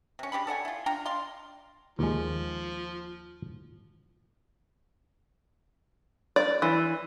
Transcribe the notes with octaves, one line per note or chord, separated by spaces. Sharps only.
C3 C#4
D4 G4 G#4 B5
A4 D5 F#5 G#5
E4 F4
D4 F4 G5 A#5
D5 F5 C6
D#2 F3 G#3
D5
E3